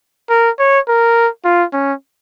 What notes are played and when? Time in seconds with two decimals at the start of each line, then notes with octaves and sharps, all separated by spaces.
0.30 A#4
0.59 C#5
0.88 A#4
1.44 F4
1.73 C#4